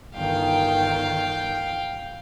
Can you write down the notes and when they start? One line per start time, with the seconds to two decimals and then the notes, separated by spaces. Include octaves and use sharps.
0.15 G1 D#3 F5 G5